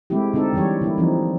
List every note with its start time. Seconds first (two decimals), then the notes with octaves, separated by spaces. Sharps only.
0.10 G#3 A3 C4 E4 G4
0.34 D3 C4 D#4 A4
0.53 D3 E3 G3 G4 C#5
0.82 D3 A#3 E4
0.98 E3 F3 C4 D#4